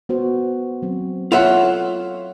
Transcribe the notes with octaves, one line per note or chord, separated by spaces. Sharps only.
B3 F#4 C5
F#3 C4
F4 A4 C#5 E5 F#5